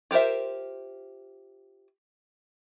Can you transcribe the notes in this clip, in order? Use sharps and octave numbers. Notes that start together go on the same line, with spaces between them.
F4 G4 A#4 C5 E5